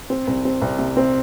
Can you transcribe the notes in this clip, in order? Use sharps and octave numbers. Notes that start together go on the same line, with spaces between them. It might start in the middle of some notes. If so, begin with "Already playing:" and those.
C4
C2
C4
C2
C3
C4